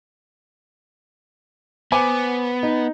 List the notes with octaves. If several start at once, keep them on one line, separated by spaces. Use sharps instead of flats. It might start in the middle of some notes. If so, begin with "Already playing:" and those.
B3 C5 G#5 D6
D#4